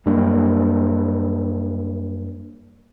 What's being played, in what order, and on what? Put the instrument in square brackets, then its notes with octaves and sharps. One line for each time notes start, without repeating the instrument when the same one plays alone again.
[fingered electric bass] F#2 G3 A#3 D4